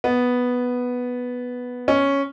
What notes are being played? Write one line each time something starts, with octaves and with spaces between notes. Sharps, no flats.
B3
C#4